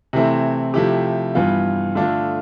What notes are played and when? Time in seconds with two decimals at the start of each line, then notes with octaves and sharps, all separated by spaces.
0.13 C3 E3 A3 C4 E4
0.74 C3 F3 A3 E4 G4
1.35 G2 E3 B3 F4
1.95 D3 A3 D4 F4